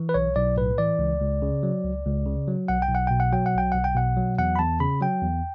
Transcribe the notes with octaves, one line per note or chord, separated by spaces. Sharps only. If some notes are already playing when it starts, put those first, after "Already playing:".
Already playing: E3
B4
B1 C#5
B1 D5
A2 B4
E3 D5
C#2
C#2
C#3
F#3
C#2
C#2
C#3
F#3
B1 F#5
G5
B1
F#5
B2 G5
F#5
F#3 G5
F#5
B1 G5
B1 F#5
G5
B2 F#5
F#3
E2 F#5
B5
E2 A5
C#3 B5
F#3 G5
E2